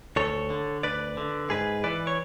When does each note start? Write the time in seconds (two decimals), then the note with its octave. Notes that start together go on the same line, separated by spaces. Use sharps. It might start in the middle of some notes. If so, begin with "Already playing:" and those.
0.16 D2 A4 C#5
0.50 D3
0.83 D2 B4 D5
1.17 D3
1.50 G#2 G#4 B4
1.84 E3 B4 D5
2.07 C#5